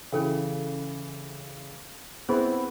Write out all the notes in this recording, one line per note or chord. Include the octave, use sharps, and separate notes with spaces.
C#3 E3 C#4 A4 G5
B3 C4 E4 G#4 C5